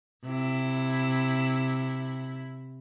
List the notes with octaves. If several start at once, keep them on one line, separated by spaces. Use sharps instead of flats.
C3 E4